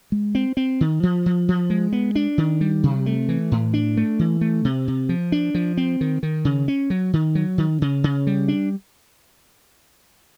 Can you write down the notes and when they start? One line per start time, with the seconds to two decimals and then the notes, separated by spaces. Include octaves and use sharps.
0.12 G#3
0.35 C4
0.57 C4
0.81 D#3
1.03 F3
1.26 F3
1.48 F3
1.70 G#3
1.93 B3
2.15 D4
2.38 D#3
2.61 G3
2.83 C3
3.06 A3
3.29 E3
3.52 A2
3.74 D4
3.97 A3
4.19 E3
4.41 A3
4.65 C3
4.88 C3
5.09 F3
5.32 D4
5.55 F3
5.77 C4
6.01 D#3
6.23 D#3
6.45 C#3
6.68 C#4
6.90 F#3
7.13 D#3
7.35 F#3
7.58 D#3
7.82 C#3
8.04 C#3
8.27 G3
8.48 D4